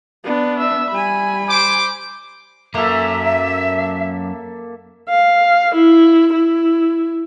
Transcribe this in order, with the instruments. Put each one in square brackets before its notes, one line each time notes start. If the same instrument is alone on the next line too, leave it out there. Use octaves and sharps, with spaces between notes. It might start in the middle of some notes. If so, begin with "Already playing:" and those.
[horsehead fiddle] B3 D4
[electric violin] E5 E6
[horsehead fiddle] G3 G#5 [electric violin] B5
[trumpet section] C5 D6
[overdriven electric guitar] F#2 A#5 [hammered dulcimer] A#3 A4 [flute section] E5
[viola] F5
E4
E4